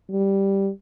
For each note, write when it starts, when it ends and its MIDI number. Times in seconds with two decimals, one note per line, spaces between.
0.11 0.70 55